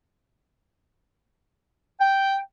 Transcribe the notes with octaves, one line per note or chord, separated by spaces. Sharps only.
G5